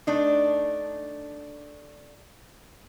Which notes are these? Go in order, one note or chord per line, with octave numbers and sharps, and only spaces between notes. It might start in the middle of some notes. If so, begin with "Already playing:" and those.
A3 D4 D#4